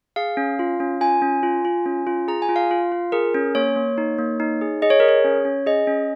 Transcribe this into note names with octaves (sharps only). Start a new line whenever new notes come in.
G#4 F5
C#4
F4
C#4
F4 G#5
C#4
F4
F4
C#4
F4
G#4 A#5
G#5
F4
F5
F4
F4
G#4 A#4
C#4
A#3 C#5
A#3
D#4
A#3
D#4
G#4
G#4 D#5
C#5
G#4 A#4
C#5
C#4
C#4
G#4 D#5
C#4